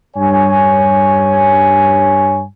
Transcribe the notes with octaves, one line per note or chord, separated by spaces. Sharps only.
G2 C#5 G#5